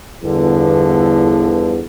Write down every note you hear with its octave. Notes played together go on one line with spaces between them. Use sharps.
G1 E2 D3 E3 F3